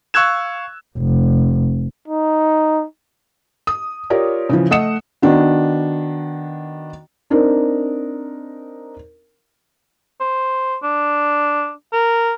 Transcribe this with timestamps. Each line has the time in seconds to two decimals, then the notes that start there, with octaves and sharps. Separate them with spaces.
0.14 F5 C#6 E6 F#6 G#6 E7
0.98 F1
2.08 D#4
3.67 D#6
4.10 F4 G4 A#4 C#5 D5
4.49 C#3 E3 F3
4.71 A3 D#5 F#5 D#6 C#7 E7
5.22 D#3 B3 D4 F#4
7.30 C4 D4 D#4 A#4
10.21 C5
10.83 D4
11.93 A#4